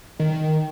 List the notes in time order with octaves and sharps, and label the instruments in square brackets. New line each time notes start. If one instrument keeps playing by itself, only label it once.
[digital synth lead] D#3